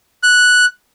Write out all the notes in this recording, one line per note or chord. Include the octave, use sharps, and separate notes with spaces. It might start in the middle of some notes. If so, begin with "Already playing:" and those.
F#6